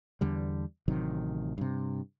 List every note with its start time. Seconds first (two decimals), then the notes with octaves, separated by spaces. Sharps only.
0.21 E2 D3 G3
0.88 A1 C3 D#3 F#3
1.58 G2 C3